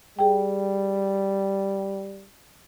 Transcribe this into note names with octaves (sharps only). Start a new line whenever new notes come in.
G3 G#4 G5